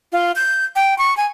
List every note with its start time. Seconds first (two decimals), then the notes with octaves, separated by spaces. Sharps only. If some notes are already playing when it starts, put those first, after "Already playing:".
0.12 F4
0.36 G6
0.76 G5
0.98 C#6
1.17 G#5